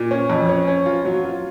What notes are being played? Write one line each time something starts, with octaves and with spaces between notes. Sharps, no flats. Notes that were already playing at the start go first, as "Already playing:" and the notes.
Already playing: A#2
C#4
F2
C#4
C#4
F4
F#3
F4